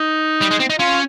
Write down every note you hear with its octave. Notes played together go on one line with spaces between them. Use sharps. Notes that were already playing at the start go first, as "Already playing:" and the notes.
Already playing: D#4
G3
G#3
C4
D#4
C#4 F4